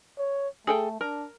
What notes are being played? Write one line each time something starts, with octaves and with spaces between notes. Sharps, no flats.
C#5
A3 G#4 A4 G5
D4 A#4